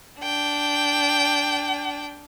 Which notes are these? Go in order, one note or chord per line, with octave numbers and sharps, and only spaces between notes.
D4 G5